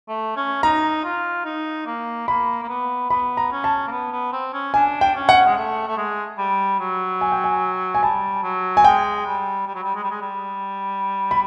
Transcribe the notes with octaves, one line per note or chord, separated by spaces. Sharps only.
A3
C#4
D#4 A#5
F4
D#4
A#3
A#3 B5
A#3
B3
B3 B5
A#5
C#4
A5
A#3
B3
B3
C4
C#4
D4 G#5
G5
C#4
F#5
G#3
A3
A3
G#3
G3
F#3
G#5
G5
G#5
G#5
G3 A5
F#3
G#5
G#3 G5
G3
G3
F#3
G3
G#3
G3
G#3
G3
B5